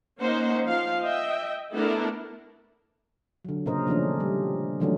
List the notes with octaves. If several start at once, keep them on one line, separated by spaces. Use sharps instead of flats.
A#3 C#4 D#4 C5 F#5
F3 F5
D#5 E5 G5
A3 B3 D4 E4 A4 A#4
D3 F#3
A#2 C#3 C#4 A#4 C5 D#5
D#3 F3 A3 C#4 D4
G3
D#3 E3 F#3 A3 C#4 D4